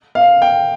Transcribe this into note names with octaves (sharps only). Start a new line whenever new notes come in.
F5
G5